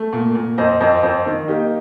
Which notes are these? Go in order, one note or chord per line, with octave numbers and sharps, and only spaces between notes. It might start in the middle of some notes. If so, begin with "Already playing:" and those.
Already playing: A3
A#2
A#2
F2 C5 D#5
F2 C5 D#5
F2 C5 D#5
D#3
A#3 D#4 G4